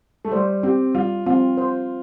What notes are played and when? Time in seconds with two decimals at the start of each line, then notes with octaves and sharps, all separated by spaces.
0.25 A3
0.32 G3 C5
0.63 C4 G4
0.95 G3 F4
1.26 C4 F4
1.58 C5